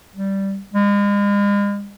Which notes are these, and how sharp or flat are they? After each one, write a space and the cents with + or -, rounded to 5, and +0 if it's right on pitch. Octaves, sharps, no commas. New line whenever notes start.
G3 -5
G#3 -40